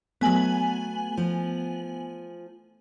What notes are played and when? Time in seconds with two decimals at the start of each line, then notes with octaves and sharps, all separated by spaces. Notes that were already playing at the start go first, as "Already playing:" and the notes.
0.21 F#3 A3 B3 G#5 F#7
1.17 F3